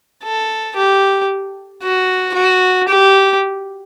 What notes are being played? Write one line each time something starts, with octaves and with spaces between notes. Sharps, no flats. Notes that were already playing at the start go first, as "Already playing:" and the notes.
A4
G4
F#4
F#4
G4